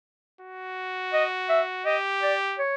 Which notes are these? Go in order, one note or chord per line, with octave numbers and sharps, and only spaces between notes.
F#4
D#5
E5
G4 D#5
D5
C#5